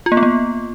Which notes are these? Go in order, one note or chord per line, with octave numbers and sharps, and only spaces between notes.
F4
A#3
B3
A#3